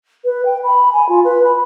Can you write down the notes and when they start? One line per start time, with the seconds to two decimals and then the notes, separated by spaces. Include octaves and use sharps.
0.25 B4
0.45 G5
0.64 B5
0.93 G#5
1.09 F4
1.24 B4
1.44 B5